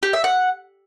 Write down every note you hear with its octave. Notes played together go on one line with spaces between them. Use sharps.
G4
E5
F#5